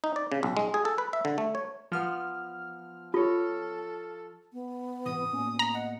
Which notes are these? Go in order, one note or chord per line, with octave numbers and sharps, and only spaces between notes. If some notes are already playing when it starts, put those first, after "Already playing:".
D#4
D5
C#3
B1
G#3
G#4
A4
B4
E5
D3
A3
C#5
F3 B3 F4 F6
F4 A4 C#5 D#5
B3
G#2 C3 E3 D#6
A2 A#3 B3 C#4
A#5
D#5 F#5